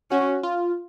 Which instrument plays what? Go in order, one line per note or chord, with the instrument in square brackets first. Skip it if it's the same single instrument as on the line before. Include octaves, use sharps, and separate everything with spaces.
[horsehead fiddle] C#4 [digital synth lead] F#4
[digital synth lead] F4